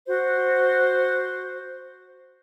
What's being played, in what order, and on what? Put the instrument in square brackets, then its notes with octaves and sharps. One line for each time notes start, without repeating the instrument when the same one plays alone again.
[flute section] F#4 C5